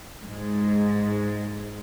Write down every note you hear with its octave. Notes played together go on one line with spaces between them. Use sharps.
G#2 G#3